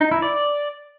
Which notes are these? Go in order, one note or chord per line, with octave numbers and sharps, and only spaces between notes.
D#4
E4
D5